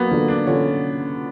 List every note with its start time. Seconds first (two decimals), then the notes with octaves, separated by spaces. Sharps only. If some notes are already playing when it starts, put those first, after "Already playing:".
Already playing: F#3 A#3 B3
0.11 D3 A#3
0.28 D4
0.46 D3 C#4